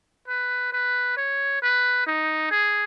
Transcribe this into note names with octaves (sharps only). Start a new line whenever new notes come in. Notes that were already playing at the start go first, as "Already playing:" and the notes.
B4
B4
C#5
B4
D#4
G#4